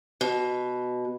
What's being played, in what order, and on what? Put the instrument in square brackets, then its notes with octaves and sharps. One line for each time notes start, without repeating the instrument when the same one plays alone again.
[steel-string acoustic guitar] B2